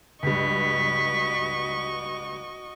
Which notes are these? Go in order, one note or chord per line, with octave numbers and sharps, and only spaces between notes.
C#2 G2 F#4 D#5 C#6 B6